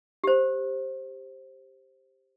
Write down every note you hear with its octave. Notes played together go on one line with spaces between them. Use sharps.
G4 C5